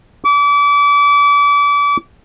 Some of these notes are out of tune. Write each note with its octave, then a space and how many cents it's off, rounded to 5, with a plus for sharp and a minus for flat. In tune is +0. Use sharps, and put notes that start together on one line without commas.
D6 -35